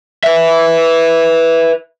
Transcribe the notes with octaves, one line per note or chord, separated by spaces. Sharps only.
B4 E5